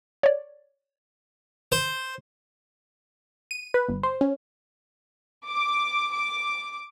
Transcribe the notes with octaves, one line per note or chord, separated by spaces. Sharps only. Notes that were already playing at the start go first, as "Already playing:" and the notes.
C#5 D5
C5
D#7
B4
G1
C5
C#4
D6
D6